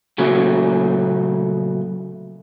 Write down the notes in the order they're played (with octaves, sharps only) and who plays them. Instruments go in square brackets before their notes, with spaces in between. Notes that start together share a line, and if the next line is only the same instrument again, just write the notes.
[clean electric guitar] A#2 C#3 F#3 A3